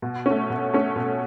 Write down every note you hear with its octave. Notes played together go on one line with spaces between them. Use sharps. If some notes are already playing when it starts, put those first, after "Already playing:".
B2
A3 C#4
B2
A3 C#4
B2